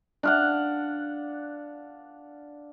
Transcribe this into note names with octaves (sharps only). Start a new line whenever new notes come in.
D4 F5 F#5